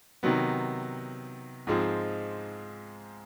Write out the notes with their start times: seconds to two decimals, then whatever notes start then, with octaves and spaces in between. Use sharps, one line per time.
0.23 C3 D#3 F#3 B3
1.67 G#2 F3 G#3 C4